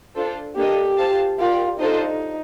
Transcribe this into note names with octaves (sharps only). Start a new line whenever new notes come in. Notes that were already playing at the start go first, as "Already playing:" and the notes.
D4 F4 A4 C5
A#3 D4 G4 A4 D#5
F4 C5 F5 A5
F4 G4 A#4 D5
D4 D#4 F4 A4 C5 D#5